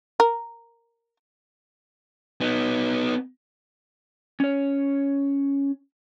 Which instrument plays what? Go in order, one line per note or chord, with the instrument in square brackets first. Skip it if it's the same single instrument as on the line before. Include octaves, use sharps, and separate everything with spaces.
[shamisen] A#4
[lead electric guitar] B3 D#4
[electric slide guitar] C#4 C#5